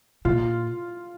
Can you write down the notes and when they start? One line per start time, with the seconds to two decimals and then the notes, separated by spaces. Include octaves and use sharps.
0.25 A#2 F4